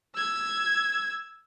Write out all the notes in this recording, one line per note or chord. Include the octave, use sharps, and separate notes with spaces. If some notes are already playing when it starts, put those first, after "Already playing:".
E6 G#6